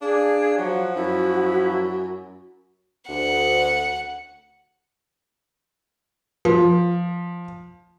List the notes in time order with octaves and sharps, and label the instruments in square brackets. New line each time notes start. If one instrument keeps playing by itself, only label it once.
[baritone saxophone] D4 [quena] G#4 [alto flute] F5
[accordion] F3 [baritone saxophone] F#3 [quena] F#5
[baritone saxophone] F#2 [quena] E4 [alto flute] F#4
[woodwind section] D2 [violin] F#5
[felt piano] F3